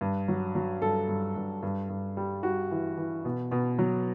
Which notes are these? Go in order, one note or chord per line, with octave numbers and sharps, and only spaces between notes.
G2
F#3
F#3
G2 A4
G2
G2
G2
G2
G3
G3 F#4
E3
E3
B2
B2
F#3